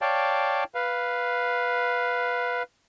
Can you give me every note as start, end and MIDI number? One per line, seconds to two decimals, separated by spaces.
0.01 0.64 73
0.01 0.64 74
0.01 0.64 77
0.01 0.64 79
0.01 0.64 81
0.75 2.63 71
0.75 2.63 77